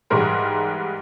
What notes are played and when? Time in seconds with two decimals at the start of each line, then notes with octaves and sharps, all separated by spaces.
0.10 G#2 E3 G3 G#3 A#4 C6